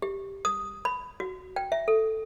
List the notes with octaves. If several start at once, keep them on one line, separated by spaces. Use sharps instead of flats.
G4
D#6
B5
F#4
G5
E5
A4